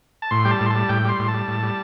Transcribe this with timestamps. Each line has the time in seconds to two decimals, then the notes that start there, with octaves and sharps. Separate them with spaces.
0.22 A5
0.31 A2 C6
0.45 G3 G5
0.51 A5
0.61 A2
0.66 C6
0.70 G3 A5
0.89 A2 G5
1.05 G3 C6
1.19 A2
1.28 A5
1.34 G3
1.48 A2
1.63 G3